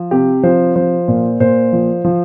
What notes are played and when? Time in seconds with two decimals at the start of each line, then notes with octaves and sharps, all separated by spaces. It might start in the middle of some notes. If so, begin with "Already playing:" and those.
Already playing: F3
0.11 C3 G4
0.43 F3 C5
0.76 F3 C5
1.08 A#2
1.40 A#2 C5
1.73 F3
2.04 F3